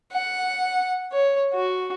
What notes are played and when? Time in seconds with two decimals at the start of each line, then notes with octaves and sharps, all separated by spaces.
0.12 F#5
1.12 C#5
1.53 F#4